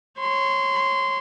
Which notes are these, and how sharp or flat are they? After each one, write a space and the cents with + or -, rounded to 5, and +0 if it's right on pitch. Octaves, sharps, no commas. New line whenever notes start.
C#5 -20 C6 -20